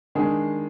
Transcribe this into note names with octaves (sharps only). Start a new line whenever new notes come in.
D#3 G#3 D4 G#4